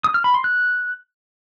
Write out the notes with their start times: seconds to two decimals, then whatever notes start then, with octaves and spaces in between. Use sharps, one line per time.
0.04 D#6
0.14 F6
0.24 B5
0.34 C6
0.44 F#6